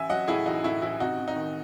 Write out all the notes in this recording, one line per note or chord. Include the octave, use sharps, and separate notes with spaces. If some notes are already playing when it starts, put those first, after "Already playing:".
Already playing: A1 E5 G#5
F#3 D#5 F#5
A2 E4 G#4
A1 D#4 F#4
A2 E4
A1 E4
C3 D#4 F#4
C3
D#4
D#3